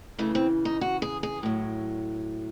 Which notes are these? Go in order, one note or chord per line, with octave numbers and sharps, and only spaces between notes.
C#3 E3 A3
C4
D#4
F#4
G#4
G#4
A2 F#3